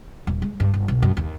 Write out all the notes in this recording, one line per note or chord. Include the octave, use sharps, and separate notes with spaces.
D#1
G#3
G2
G1
B1
F#2
D#2